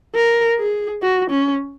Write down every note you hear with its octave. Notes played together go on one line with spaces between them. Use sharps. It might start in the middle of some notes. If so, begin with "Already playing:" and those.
A#4
G#4
F#4
C#4